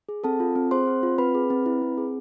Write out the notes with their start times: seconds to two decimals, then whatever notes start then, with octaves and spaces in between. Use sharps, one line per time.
0.09 G#4
0.24 C4 A4 A5
0.40 F4
0.55 C4
0.71 G#4 C5 C6
0.87 C4
1.03 F4
1.18 C4 B4 B5
1.35 G#4
1.50 C4
1.66 E4
1.82 C4
1.98 G#4